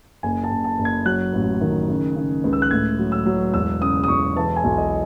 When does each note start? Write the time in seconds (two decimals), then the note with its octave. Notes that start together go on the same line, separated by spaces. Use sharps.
0.23 F#1 G#5
0.44 A5
0.51 F#1
0.64 A5
0.78 F#1
0.85 G#6
1.06 F#3 F#6
1.33 A1
1.61 D#3
1.88 C#3
2.16 C#3
2.44 C#2
2.53 E6
2.62 F#6
2.71 A2 G#6
2.99 F#3
3.12 E6
3.26 F#3
3.54 E1 E6
3.81 C#3 D#6
4.04 D#6
4.08 E1 C#6
4.36 E3 A5
4.56 G#5
4.64 B1
4.78 D#5